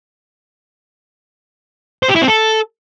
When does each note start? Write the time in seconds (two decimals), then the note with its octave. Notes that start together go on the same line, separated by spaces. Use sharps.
2.03 C5
2.09 G4
2.15 E4
2.22 C4
2.28 A4